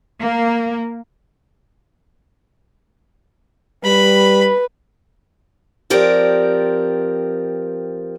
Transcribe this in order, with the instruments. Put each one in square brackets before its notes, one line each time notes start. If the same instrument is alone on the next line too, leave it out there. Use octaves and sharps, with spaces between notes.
[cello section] A#3
[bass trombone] G3 [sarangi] B4 [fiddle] B5
[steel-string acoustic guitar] F3 C4 G4 A#4 D5